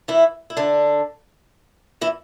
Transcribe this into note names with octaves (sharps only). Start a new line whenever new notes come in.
E3 E4
E4
D3 D4
E3 E4